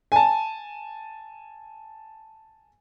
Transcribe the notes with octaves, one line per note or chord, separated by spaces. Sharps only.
G#5 A5